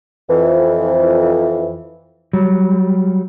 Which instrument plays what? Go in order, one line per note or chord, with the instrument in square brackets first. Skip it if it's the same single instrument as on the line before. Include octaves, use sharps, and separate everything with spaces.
[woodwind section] F2 E3
[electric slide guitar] F#3 G3